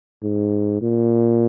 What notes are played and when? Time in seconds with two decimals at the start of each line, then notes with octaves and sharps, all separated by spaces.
0.23 G#2
0.82 A#2